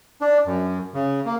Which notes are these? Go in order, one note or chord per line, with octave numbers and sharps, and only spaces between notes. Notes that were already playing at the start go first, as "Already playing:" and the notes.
D4
F#2
C#3
A#3